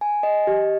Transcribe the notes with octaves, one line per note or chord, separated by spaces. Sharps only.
G#5
D#5
G4